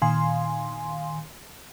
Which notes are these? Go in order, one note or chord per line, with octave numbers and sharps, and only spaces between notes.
A#2 D#3 F5 G#5 C6